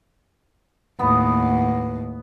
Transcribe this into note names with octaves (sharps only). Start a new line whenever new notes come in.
D#2 A2 B3